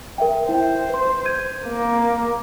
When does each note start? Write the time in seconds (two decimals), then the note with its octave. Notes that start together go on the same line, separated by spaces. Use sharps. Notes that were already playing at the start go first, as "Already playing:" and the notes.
0.18 A#4 E5 G5
0.49 E4 C5 E5 G5
0.89 B4 C6
1.25 G6 G#6 D#7
1.66 A#3